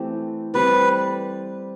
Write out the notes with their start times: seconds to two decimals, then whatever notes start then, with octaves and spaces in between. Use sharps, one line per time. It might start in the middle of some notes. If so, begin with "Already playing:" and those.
Already playing: E3 A3 C4 G4
0.54 G3 C4 G4 B4 D5